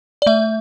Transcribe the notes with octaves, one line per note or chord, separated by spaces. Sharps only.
D5
A3 E5